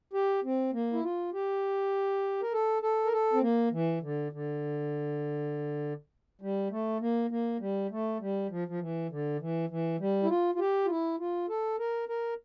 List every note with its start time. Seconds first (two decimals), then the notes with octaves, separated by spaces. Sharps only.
0.13 G4
0.44 C4
0.73 A#3
0.93 E4
1.03 F4
1.33 G4
2.42 A#4
2.53 A4
2.82 A4
3.05 A#4
3.12 A4
3.33 C4
3.42 A#3
3.72 E3
4.02 D3
4.32 D3
6.41 G3
6.71 A3
7.01 A#3
7.30 A#3
7.60 G3
7.91 A3
8.20 G3
8.50 F3
8.68 F3
8.80 E3
9.10 D3
9.40 E3
9.70 E3
10.00 G3
10.23 E4
10.29 F4
10.55 F4
10.59 G4
10.85 F4
10.89 E4
11.19 F4
11.49 A4
11.79 A#4
12.09 A#4